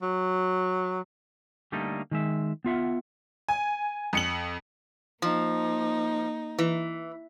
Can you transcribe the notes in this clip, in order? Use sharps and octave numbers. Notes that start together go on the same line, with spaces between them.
F#3
D3 G3 A3 A#3 D#4
D#3 G#3 E5
B3 F4 E5 F#5
G#5
F2 C#7 F#7
F3 A#3 D#4
E3